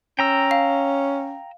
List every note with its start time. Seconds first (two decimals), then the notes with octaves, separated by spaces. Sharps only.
0.19 C#4 G5 A#5 E6
0.51 F5